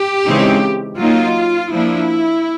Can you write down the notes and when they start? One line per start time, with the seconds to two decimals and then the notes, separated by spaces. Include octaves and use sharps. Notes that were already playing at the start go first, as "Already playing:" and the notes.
Already playing: G4
0.26 C#3 E3 G#3 C4 D#4
0.99 F#3 A#3 D#4 F4
1.72 F3 A#3 D4 E4